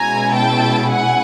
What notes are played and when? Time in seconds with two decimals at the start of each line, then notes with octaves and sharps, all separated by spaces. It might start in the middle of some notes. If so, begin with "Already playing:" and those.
Already playing: B2 G#3 C#4 E4 G#5 A#5
0.34 G5 A5
0.90 F#5 G#5